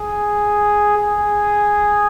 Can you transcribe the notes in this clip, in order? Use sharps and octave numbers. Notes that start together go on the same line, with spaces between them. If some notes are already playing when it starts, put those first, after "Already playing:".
Already playing: G#4
G#4